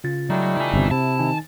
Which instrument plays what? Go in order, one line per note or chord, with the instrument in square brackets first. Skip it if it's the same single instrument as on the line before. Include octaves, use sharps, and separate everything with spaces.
[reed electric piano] C#3 F4 A6
[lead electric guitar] F#3 [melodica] G3 A3 D#4
[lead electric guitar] E4 G#5
[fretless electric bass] G1 C3
[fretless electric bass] C3 [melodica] E4 [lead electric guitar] A5
[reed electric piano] D#3 D#4 G#5